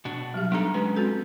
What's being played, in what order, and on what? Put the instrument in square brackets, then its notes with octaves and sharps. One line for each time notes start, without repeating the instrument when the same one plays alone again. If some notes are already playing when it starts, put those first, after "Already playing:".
[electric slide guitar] B2 D4 F#4
[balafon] F#3 G3 G4
[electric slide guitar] B3 D#4 A4 [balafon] D4 A#5
[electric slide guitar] G#3 C#4 G4 [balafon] B4
[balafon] C4 F#4 A4